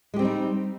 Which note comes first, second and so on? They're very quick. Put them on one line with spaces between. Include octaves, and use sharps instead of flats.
G#3 G4 C4 G3 D#4